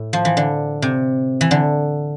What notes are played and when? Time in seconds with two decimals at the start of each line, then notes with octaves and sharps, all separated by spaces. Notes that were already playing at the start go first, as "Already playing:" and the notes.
Already playing: A2
0.13 F3
0.25 E3
0.37 D3
0.82 C3
1.41 E3
1.51 D3